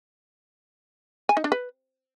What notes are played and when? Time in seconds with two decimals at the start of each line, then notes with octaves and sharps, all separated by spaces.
1.29 G#5
1.37 D#4
1.44 D4
1.52 B4